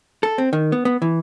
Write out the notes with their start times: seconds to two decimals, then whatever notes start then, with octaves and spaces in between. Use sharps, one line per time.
0.23 A4
0.38 C4
0.53 D#3
0.72 B3
0.85 B3
1.02 E3